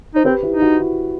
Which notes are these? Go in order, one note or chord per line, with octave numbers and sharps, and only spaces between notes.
D#4 C5
C4 G4 B4
E4 G4
D#4
F#4
E4